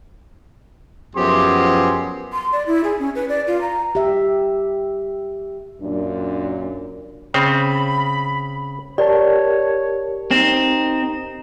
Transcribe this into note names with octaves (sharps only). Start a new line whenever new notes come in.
F#2 F3 B3 G4 G#4 C6
C6
D5
E4
G#4
C#4
B4
D5
F4
A#5
G4 E5
F#2 A#2 D4
C#3 C4 B5
G4 A#4 C#5 D5 A5
C4 D#4